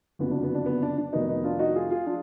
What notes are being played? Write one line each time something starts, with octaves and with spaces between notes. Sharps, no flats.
F#1 F2 D3 F#3 B3
D4
B3
D4
B3
D4
D4
F1 F2 D#3 F#3 B3 D#4
B3 D#4
D4 F4
D#4 F#4
F4 G#4
F4 G#4
F3 D4 F4